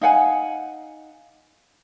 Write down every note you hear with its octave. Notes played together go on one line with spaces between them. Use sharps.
D#4 F5 F#5 G#5